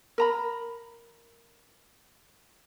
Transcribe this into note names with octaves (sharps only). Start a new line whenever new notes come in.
A#4 A#5 B5